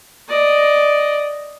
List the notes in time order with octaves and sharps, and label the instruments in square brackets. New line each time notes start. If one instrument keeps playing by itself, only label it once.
[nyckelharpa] D5 D#5